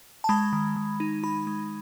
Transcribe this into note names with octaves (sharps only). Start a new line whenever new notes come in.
A5
G#3 B5
D#3
D#3
D#4
D#4 B5
G#3